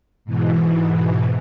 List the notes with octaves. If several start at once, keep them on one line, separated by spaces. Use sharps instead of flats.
G#2 B2 E3